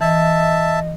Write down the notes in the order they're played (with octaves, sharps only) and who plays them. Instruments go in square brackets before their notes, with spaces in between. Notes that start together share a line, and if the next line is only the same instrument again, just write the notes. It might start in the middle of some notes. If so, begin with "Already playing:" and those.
[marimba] E3 [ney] D#5 [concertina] E5 A5